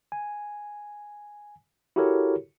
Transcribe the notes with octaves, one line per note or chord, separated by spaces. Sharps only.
G#5
E4 F#4 G4 A4 A#4 C#5